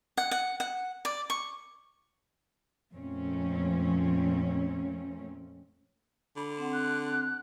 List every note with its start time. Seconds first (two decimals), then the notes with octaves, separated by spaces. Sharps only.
0.17 F#5
0.31 F#5
0.60 F#5
1.05 D5
1.30 C#6
2.93 F2 A#2 A3 C4 C#4
6.37 D3 B5
6.58 C4 F#5
6.73 F#6